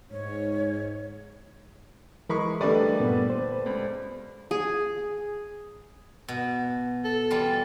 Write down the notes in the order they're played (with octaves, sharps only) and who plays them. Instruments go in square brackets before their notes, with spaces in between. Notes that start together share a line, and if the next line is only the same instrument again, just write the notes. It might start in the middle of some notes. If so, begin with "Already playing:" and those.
[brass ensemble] G#2 [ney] C#5
[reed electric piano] E3 A#4 B5 [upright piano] G#3 C#6
[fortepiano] D3 G3 A3 [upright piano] B4 D5
[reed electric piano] G2 A#2 B3
C5
[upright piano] C#2
[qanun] G#4
[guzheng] B2
[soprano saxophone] A4
[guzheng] E3 G3 F4